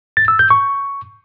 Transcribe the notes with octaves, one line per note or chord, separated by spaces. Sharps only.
A6
E6
G6
C#6